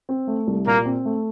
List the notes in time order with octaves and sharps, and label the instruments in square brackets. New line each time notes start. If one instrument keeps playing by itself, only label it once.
[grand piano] C4
A3
C2
[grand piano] A#2 [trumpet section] A#3
[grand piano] C4
A3